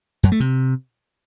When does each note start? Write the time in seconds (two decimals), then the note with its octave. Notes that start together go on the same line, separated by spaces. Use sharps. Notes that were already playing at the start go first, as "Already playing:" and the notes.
0.23 F#2
0.32 A3
0.40 C3